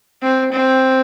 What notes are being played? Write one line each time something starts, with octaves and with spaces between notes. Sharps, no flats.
C4
C4